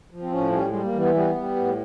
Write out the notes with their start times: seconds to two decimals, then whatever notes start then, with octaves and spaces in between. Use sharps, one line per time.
0.11 F3
0.22 C4
0.32 A2 C#4
0.52 G3 C#4
0.68 G3 G#3
0.83 A#3
0.93 E3
0.99 B3
1.14 G3 B3
1.35 G3
1.56 A2